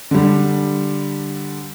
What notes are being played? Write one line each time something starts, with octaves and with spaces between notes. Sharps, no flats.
D3 G3